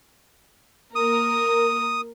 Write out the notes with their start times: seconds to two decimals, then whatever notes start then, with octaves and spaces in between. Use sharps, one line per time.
0.96 A#3 A#4 D#6